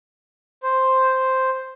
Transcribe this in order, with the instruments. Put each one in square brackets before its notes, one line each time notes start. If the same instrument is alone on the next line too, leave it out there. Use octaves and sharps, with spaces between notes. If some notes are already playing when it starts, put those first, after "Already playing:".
[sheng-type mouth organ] C5